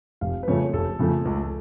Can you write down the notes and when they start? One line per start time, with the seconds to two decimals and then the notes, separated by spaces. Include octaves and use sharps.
0.21 F1 F5
0.43 B4
0.48 F2 C#3 F3 A3 C#5
0.73 F1 A4
0.99 F2 C#3 F3 A3
1.25 C#2